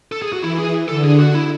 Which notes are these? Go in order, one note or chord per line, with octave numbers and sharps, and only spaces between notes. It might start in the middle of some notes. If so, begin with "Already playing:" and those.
A4
G#4
F#4
E3 E4
G#4
D3 A4
G#4
F#4
E4